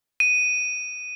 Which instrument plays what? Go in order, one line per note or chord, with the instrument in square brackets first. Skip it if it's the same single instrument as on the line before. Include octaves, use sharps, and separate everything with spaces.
[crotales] D#7